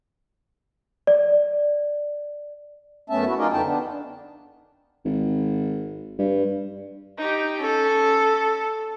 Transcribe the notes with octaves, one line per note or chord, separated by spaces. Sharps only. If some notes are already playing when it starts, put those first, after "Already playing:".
D5
F#2 A3 B3 C#4 E5 A5
E4 F#4
D#4 F4 G#4 A#4 D5 D#5
F2 D3 B3 D#4 G5 A5
B3 D4
G#1
G2
D#4 G4
C#4 A4